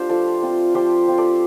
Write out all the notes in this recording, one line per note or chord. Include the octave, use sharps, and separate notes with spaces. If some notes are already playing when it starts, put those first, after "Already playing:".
Already playing: A3 D4 F4 G4 C5 F5
F3 A4 D5
C4 F4
F3 G4 C5
C4 F4
A4 D5